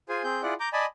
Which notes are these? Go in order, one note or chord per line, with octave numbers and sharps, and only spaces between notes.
F4 G#4 C5 G#5
C4 G#4 G6
E4 F4 G#4 D5 F#5
A#5 D6 G6
D5 D#5 G#5 A5 B5